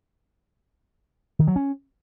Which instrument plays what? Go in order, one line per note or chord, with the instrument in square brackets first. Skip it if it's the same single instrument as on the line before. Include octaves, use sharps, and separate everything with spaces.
[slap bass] D#3
F#3
C#4